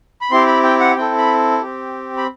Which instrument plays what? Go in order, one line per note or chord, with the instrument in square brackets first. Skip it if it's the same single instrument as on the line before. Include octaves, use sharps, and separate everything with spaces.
[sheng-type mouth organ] B5
C4 E4 G4 C6
B5
G5
F#5
C4 E4 A4 G5
B5
C4 G4
B5